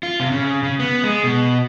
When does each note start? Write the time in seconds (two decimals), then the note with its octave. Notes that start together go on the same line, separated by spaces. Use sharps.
0.03 F4
0.20 C3
0.32 C#3
0.63 C#3
0.80 B3
1.04 G#3
1.24 B2